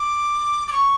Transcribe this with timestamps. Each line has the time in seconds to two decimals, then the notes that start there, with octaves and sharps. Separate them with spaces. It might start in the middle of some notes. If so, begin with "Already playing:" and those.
Already playing: D6
0.68 D6
0.72 C#6